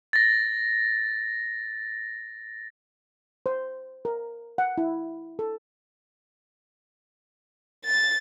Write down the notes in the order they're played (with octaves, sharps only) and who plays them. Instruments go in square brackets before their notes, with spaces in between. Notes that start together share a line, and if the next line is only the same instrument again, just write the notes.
[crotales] A6 A#6
[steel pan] C5
A#4
F#5
E4
A4
[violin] A6